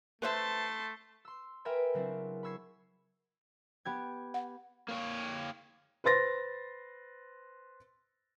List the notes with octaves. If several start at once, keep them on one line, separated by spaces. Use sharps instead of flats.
A3 B4 C5 E5 A5 C6
C6 E6
A#4 B4 E5 G5 G#5 B5
C#3 F#3 C4 D4 E4
B5 C#6 E6 G#6 C7
B3 G4 G#6
F#5
A#3 C#5
B4 C5 C6 A6 A#6